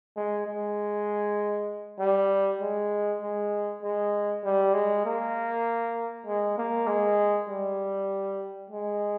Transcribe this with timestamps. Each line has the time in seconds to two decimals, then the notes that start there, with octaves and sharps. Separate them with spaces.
0.16 G#3
0.47 G#3
1.99 G3
2.61 G#3
3.22 G#3
3.82 G#3
4.44 G3
4.74 G#3
5.05 A#3
6.27 G#3
6.58 A#3
6.87 G#3
7.49 G3
8.70 G#3